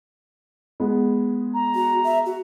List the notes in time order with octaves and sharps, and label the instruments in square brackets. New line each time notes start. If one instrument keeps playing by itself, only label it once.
[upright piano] G#3 B3 G#4
[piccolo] A#5
[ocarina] F#4
E5
F#4